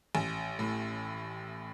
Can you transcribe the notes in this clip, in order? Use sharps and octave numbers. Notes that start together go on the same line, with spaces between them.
A1
A2